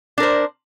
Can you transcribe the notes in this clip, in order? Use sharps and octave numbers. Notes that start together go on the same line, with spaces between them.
D4 A#4 C5